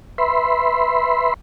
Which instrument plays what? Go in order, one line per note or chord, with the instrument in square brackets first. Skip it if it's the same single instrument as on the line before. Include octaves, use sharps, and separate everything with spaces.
[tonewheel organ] B4 E5 B5 C6